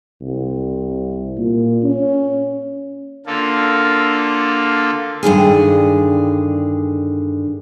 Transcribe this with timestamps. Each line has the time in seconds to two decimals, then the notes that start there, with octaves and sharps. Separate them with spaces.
0.22 C2
1.38 A#2
1.83 C#4
3.26 D3 A#3 F4 A4
5.23 G2 D3 D#3 G#4